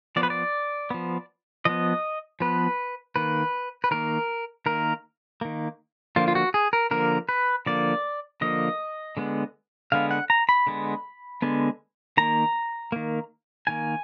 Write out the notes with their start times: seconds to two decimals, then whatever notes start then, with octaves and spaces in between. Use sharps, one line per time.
0.16 F3 B3 D5
0.23 B4
0.30 D5
0.91 F3 B3
1.65 F3 B3 D#5
2.40 F3 B3 B4
3.16 D#3 A#3 B4
3.84 B4
3.91 D#3 A#3 A#4
4.66 D#3 A#3 A#4
5.41 D#3 A#3
6.16 D3 F3 A#3 F4
6.28 F4
6.35 F#4
6.54 G#4
6.73 A#4
6.91 D3 F3 A#3 A#4
7.29 B4
7.66 D3 F3 A#3 D5
8.41 D3 F3 A#3 D#5
9.17 D3 G#3 B3
9.92 D3 G#3 B3 F5
10.11 F#5
10.30 A#5
10.49 B5
10.67 D3 G#3 B3
11.42 D3 G#3 B3
12.17 D#3 A#3 A#5
12.92 D#3 A#3
13.67 D#3 A#3 G#5